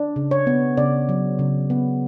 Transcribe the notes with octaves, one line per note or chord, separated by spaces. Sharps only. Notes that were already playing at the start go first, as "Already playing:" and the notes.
Already playing: D4
C#3
C#5
B3
C#3 D5
F#3
C#3
B3